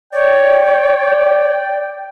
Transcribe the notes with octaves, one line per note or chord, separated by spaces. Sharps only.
C#5 D5 G5